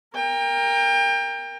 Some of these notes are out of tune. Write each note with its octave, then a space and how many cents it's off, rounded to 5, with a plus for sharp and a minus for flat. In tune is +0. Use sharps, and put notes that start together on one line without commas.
A#4 +0 G5 +30